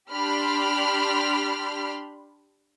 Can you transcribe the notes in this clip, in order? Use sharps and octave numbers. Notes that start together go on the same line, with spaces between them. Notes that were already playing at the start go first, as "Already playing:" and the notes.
D4 G4 B5 C6 F6